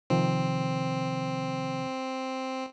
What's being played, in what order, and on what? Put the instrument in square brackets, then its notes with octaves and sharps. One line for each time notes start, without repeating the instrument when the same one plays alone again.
[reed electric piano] C3 D#3 F3 [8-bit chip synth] C4